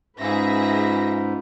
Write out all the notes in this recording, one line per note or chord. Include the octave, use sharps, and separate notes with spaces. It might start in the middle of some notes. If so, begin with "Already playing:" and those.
G#2 C#4 F4 G#4 B4 E5 F5 A#6